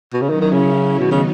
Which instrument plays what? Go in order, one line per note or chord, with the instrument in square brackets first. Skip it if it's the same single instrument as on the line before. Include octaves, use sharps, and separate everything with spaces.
[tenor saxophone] B2
C#3
[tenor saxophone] D#3 [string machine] F#3 C#4 E4
[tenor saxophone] D#3
C#3
[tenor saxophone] B2 [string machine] D#3 F#3 B3 D#4
[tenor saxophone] C#3